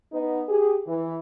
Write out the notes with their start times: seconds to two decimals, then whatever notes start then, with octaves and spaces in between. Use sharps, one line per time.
0.12 B3 D#4
0.48 G4 G#4
0.87 E3